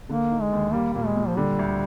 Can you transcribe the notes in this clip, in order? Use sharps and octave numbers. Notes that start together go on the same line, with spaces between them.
D3 A#3
D#4
G#3
D#2
G3 A#3
A#2 A#3
G#3
A#2
F3
D3 G3
D2